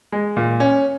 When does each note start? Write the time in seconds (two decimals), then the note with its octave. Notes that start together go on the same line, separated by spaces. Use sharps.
0.12 G#3
0.36 A#2
0.60 C#4